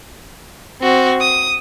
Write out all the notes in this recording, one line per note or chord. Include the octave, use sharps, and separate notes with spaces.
C4 F#4
D#6